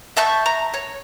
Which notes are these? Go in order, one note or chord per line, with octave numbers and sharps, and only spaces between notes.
E5 A5 C#6 G6
A#5
C#5